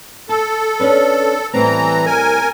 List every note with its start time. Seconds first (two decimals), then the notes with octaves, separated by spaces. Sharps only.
0.29 A4 A5
0.80 C#4 D4 B4
1.54 A2 E3 G3 C4 A#5
2.06 A#4 G#5